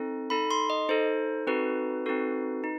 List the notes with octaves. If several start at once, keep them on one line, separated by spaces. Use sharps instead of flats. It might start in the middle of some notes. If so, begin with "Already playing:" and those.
Already playing: C4 D#4 A4
D#4 A4 B5
C6
D#5
D#4 A4 C5
C4 D#4 F#4 A4 B4
C4 D#4 F#4 A4
D#4